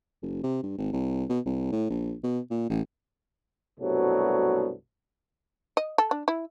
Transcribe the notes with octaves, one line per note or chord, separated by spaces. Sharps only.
F#1
C3
G2
G#1
C2
B2
C2
A2
A#1
B2
A#2
A1
C2 G2 B2 F#3 A3
D#5
A4
D4
E4